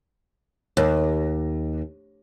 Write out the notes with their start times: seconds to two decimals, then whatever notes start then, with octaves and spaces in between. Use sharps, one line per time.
0.77 D#2